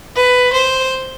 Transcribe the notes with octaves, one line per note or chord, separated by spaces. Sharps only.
B4
C5